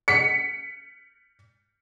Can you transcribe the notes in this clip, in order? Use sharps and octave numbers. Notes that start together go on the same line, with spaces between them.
B6 C#7